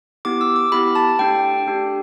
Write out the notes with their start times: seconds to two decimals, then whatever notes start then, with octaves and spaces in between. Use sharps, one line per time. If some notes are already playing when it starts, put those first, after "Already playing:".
0.25 B3 E4 G4 D6
0.41 E6
0.56 D6
0.72 B3 E4 G4 B5
0.95 A5
1.19 A3 D4 G4 G5
1.66 A3 D4 G4